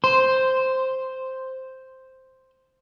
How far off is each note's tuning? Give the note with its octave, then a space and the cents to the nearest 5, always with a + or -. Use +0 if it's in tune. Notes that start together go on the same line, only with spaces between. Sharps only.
C5 +0 C6 -15